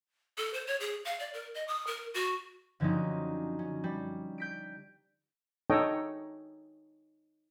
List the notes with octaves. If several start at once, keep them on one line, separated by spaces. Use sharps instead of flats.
A4
C5
C#5
G#4
F5
D5
A#4
D#5
D#6
A#4
F#4
F#2 D3 F3 C4 C#4 D#4
C#4
G3
G6 B6 D7
D#4 A4 C#5 D#5 G5